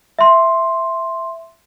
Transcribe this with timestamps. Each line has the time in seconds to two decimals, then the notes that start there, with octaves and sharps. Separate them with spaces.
0.19 E5 C6